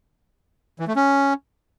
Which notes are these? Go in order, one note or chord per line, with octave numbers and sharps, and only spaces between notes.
E3
A3
C#4